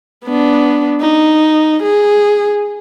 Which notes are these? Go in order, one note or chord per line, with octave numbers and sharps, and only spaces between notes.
B3 D4
D#4
G#4